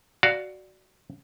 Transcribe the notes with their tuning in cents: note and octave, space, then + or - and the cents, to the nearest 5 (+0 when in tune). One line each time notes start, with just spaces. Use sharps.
F#4 +10 D5 +0 F5 +0